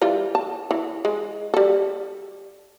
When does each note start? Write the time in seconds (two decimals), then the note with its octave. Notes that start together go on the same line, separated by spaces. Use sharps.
0.01 E3 G3 F4
0.35 A5
0.71 E3
1.05 G#3
1.54 G3 A4